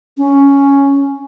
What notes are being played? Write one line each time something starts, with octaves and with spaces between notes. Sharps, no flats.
C#4